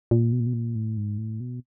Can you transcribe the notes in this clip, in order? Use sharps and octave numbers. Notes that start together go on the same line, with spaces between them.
A#2
B2
A#2
B2
A#2
A2
G#2
A2
B2